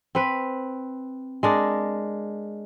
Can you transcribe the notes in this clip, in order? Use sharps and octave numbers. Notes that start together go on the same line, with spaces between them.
C4 B4
G#3 D4 A#4